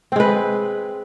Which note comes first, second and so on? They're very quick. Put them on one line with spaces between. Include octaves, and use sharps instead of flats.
C4 G#3 B4